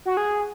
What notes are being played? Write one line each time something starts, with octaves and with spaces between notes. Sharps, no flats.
F#4
G#4